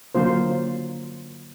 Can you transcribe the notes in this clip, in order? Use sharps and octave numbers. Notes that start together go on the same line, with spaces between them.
D3 F#3 A#3 F4 C5